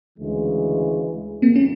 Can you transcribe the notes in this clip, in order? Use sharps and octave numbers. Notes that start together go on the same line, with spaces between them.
D2 C#3 E3 G#3
G1 F2 A#3 C4
C#4